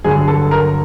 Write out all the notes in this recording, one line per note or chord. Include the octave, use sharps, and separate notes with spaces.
G2 D3 F#3 G#4 G#5
A4 A5
A#4 A#5